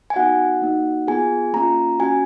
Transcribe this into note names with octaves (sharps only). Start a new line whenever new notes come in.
G#5
B3 D#4 F#4 F#5
A#3 D#4 F#4
B3 F4 G#4 G#5
A#3 C#4 F4 A#5
C#4 F#4 G#5